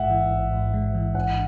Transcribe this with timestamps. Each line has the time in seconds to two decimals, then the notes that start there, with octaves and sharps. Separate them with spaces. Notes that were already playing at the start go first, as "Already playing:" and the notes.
Already playing: A1 G#2 G#3 E5 F#5
0.10 E3
0.31 A1
0.53 G#2
0.74 G#3
0.95 E3
1.15 A1 F#5